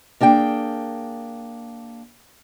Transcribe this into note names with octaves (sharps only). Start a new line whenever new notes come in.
A#3 D4 G#4 G5